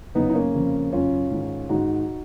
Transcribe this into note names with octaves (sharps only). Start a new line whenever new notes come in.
F#2 C#3 B3 D#4
D#4
A#3 C#4
F2 C#3
F#2 C#3 C#4 F4
G#2 D#3
G#2 D#3 D#4 F#4